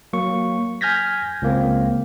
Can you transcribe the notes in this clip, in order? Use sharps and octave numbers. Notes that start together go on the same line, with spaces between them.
F#3 A#3 C#6
G#5 F6 G6 G#6 A#6 B6
C#2 A#3 C4